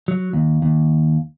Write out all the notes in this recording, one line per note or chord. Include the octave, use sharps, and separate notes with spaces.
F#3
D#2
D#2